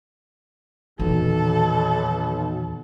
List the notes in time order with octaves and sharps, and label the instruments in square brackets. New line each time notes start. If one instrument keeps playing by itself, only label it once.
[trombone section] B1 [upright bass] E2 [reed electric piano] A#2 D#3 E3 [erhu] A4